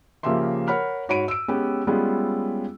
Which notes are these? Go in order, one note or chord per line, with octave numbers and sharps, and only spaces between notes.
C#3 F3 A#3 G4 E5 C6
A#4 C#5 F#5 B5 F6
G#2 F#4 C#5 B5 D7 D#7
E6 D7
G#3 B3 C#4 G4 G5
G3 G#3 B3 C#4 F4